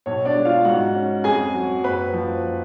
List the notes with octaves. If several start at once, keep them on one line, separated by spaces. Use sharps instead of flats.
B1 C#5
D4 D5
G#3
F4 F5
G#2 F#4 F#5
C#4
F2 G#4 G#5
F#3
F#1 B4 B5
F3